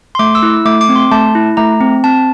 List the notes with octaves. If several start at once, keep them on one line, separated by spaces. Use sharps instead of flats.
C6
A3 D6
E6
E4
A3 D6
D6
C4
C6
A3 A5
E4
A3 A#5
C4
C4 A5